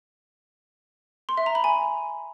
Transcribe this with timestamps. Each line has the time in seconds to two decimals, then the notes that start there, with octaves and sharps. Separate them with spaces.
1.29 C6
1.37 E5
1.46 A#5
1.55 B5
1.64 G#5